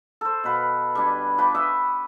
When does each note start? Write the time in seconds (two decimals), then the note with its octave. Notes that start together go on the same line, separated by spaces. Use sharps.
0.21 A4 C5
0.44 B2 B4 F5
0.95 G3 D4 G#5
1.38 F3 B4 G5 D6
1.55 D#5 E5 C#6